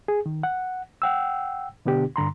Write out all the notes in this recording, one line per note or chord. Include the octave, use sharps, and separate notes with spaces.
G#4
D#3
F#5
F#5 G5 E6
B2 D3 B3 D4 G4
G2 D3 A#5 C6